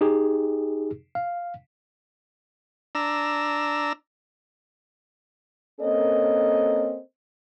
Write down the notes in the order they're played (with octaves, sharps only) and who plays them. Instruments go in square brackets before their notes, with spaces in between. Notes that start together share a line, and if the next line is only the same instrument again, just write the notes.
[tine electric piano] D#4 G4 G#4
F5
[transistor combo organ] D4 A#5 E6
[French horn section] A#3 C4 C#4 A4 A#4 D#5